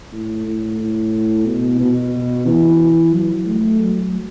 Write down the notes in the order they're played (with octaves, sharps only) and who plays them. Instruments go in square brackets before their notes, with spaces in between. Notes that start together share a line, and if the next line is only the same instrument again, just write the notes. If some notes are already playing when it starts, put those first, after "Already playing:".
[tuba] A2
A2
A2
B2
B2
E3
F#3
A3
F#3